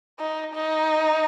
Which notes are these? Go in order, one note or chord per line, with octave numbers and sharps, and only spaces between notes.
D#4
D#4